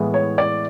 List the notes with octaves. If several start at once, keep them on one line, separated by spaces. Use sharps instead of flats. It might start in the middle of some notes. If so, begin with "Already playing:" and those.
Already playing: A2 E3 G#3 B3
C#5
D5